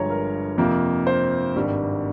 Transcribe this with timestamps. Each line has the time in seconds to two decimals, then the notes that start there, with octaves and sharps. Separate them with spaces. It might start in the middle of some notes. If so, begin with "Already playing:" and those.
Already playing: G1 G2 F3 G#3 C#5 A#5
0.10 A#4
0.58 F2 C3 F3 A#3
1.07 C5
1.55 G#1 G2 G3